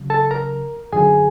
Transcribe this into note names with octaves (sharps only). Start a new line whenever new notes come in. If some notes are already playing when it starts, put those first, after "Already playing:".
Already playing: C#3 F#3
A4 A5
A#4 A#5
F#2 D3 F#3 G#4 G#5